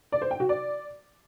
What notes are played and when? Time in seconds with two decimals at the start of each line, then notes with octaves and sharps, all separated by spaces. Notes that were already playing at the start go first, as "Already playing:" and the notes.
0.12 D5
0.22 C5
0.31 G5
0.40 F#4
0.49 D5